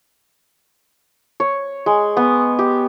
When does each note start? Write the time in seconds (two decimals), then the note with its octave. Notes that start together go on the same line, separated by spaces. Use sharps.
1.40 C#5
1.86 G#3
2.17 B3
2.59 G4